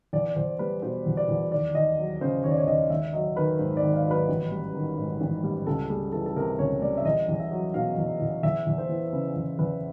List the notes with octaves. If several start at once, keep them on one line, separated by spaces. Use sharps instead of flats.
E2 D5
E2 C5
G3 B4
B2 C5
E2
D5
E2
D#2 D5
D#2 D#5
F#3
C#3 C5
D#2 C#5
D5
C#5
D#2 D#5
G#1 E5
F#3 D#5
D#3 B4
G#2 C5
D5
G#1
F5
F#3
B4
A1
G3
D#3
G#2
A1
G3
C#2 A4
G3 G#4
E3 A4
A4
C3 A#4
C#2 C#5
G3 D5
E5
E2 D#5
E2
E5
F#3
B2 F5
E2
E2
E2 E5
E2
C5
E3
C#3 B4
E2
E2 B4